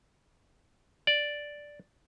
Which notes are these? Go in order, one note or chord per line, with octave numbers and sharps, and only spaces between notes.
D5